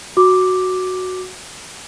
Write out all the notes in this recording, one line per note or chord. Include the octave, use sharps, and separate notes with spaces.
F#4 D6